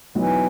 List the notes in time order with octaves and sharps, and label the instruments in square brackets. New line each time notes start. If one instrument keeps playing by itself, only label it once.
[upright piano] B2 F#3 B3 D#4 [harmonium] E3